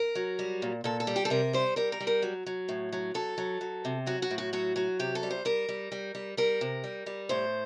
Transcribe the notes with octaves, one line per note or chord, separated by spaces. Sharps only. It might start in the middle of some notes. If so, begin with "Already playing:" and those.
Already playing: A#4
F#3
G3
A#2
A#2 A4
A4
G3
G4
A4
C3 A#4
G3 C5
G3 A#4
A#4
G3
A#4
F#3
F#3
A2
F#3
F#3 A4
F#3
F#3
C3
F#3 F#4
F#4
A2
F#4
F#3 F#4
F#3 F#4
C3 G4
A4
G3
C5
G3 A#4
G3
G3
G3
G3 A#4
C3
G3
G3
A2 C5